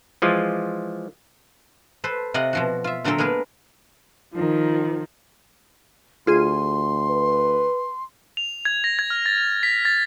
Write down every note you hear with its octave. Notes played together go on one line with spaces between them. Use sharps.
E3 F3 G#3 F4
A4 B4 C5
C3 D5 D#5 F5 F#5
B2 F3 F#4
F4 E5
A#2 D3 F#3 C4 A4 A#4
G#3 A#3 B3 G#4 A#4 B4
D#3 F3
D2 F4 G#4 C6 D#7
B4
F7
G#6
A#6
G#6
F6
A6
F7
B6
A6